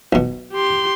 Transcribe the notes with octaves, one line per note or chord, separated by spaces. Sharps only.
B1 B2
G4 C6